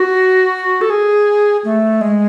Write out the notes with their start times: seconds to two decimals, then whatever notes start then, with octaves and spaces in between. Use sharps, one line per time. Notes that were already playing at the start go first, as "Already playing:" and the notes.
Already playing: F#4
0.81 A4
0.90 G#4
1.65 A3
2.01 G#3